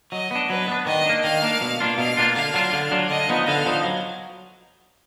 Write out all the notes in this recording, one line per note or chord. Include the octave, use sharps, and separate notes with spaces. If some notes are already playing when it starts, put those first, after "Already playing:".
F#3 D#5
B3 D4
F#3 B4
B3 D4
D#3 D#5
A#3 D4
D#3 F5
A#3 D4
B2
A#3 D4 F4
B2 F5
A#3 D4 F4
D3 F5
F#3 D4 F4
D3
F#3 D4 F4
D3 D#5
F3 B3 D#4
D3 F5
F3 B3 D#4
F#3